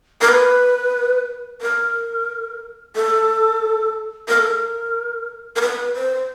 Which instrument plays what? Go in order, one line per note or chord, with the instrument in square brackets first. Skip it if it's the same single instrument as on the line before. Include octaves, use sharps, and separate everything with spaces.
[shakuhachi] A#4
B4
A#4
A4
A#4
A4
A#4
A#4
B4
C5